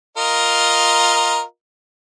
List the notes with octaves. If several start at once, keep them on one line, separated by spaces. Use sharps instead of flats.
F4 A#4 D#5